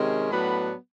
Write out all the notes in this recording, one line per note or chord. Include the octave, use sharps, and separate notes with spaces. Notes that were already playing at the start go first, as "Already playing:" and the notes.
Already playing: C3 D#3 G#3 C#4
A2 F#3 B3 D4 B5